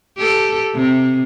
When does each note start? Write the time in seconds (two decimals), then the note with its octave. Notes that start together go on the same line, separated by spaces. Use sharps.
0.17 G4 A4
0.74 C3